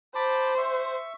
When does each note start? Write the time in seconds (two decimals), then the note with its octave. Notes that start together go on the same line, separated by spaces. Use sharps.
0.15 C5 A5 B5 D6
0.57 E5 C#6